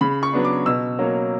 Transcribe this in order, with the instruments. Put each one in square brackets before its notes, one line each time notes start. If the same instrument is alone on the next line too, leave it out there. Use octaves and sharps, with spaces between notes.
[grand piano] C#3 B5
C#6
F#3 B3 D4
D6
B2 E6
F#3 A#3 C#4